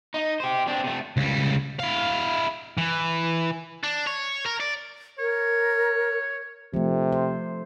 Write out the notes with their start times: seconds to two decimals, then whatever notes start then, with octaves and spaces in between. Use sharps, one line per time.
0.14 D#4
0.40 G4 C5
0.67 C4 D4
0.84 C3 A3
1.17 C#2 G3
1.80 E4 F5
2.78 E3
3.84 D4
4.07 C#5
4.46 A#4
4.60 D5
5.19 A#4 C#5
6.74 C3 F3 A3
7.12 C5